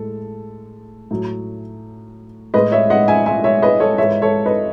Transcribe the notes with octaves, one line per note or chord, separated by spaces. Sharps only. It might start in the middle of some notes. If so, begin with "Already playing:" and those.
Already playing: A2 G#3 A4
A2 F#3
A2 G#3 B4 D#5
C#5 E5
D#5 F#5
E5 G#5
E5 G#5
C#5 E5
B4 D#5
A4 C#5
G#2 E3 G#3 C#5 E5
A4 C#5
B4 D#5